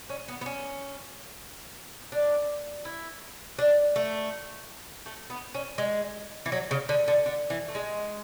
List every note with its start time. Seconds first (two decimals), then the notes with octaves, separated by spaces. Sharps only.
0.10 C#4
0.28 B3
0.41 B3
0.46 C#4
2.12 D4
2.85 E4
3.59 D4
3.96 A3
5.06 A3
5.30 B3
5.54 C#4
5.78 G#3
6.46 E3
6.52 F#3
6.71 C#3
6.89 D3
7.08 D3
7.26 D3
7.50 E3
7.68 A3
7.75 G#3